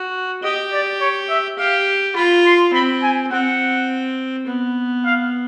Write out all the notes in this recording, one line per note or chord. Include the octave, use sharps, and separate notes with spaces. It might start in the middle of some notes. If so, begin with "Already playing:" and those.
Already playing: F#4
G4 D#5
D5
C#5
E5
G4 F5
F4 B5
C6
C4 B5
G#5
C4 F#5
B3
F5